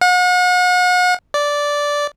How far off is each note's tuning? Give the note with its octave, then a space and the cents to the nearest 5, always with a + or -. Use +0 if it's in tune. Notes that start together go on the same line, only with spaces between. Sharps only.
F#5 -40
D5 -10